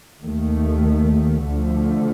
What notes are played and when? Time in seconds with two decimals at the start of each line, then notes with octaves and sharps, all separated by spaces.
0.22 D#2 D#3 A3
1.44 D2 D3 F3 A3